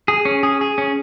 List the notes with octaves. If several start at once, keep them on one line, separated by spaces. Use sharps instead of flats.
G#4
C#4
G#4
G#4
C#4